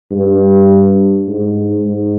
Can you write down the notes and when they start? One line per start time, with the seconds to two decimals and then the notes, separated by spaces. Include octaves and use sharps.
0.11 G2
1.28 G#2
1.87 G#2